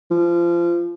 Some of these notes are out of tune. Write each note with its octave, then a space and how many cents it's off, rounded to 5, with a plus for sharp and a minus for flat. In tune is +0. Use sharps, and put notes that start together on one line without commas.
F3 -25